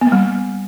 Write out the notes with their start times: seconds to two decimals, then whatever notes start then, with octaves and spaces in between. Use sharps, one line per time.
0.01 B3
0.07 A#3
0.12 G3